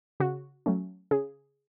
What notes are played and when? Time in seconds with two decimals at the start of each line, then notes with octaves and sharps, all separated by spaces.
0.20 C#3 F#4
0.66 F#3 A3 C#4
1.11 C#3 G#4